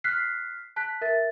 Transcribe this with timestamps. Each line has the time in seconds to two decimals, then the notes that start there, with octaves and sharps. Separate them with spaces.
0.04 F6 F#6 B6 C7
0.76 A5 F#6 B6
1.01 A#4 E5 A6